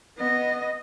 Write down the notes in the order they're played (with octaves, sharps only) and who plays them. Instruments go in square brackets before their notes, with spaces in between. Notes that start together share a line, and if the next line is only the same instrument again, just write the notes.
[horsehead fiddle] B3 D#5